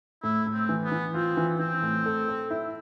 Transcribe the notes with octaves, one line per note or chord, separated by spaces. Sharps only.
A2 E4
A2
C4
E3
B3
E3
C4 F4
E3
E3 C4
A2
A4
A4
E4